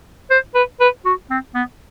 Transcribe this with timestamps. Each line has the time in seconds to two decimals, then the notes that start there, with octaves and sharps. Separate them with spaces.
0.30 C5
0.55 B4
0.80 B4
1.05 F#4
1.30 C4
1.55 B3